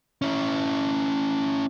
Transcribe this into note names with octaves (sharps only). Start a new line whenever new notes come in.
C#4 E4